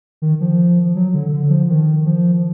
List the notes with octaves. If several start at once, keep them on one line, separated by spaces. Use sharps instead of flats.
D#3
F3
F#3
D3
D3
F3
D#3
F3